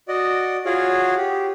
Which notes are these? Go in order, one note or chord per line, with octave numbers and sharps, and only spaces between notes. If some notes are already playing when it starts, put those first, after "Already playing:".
F#4 D5 D#5
F4 F#4 G#4 C#5 F5 F#5
G4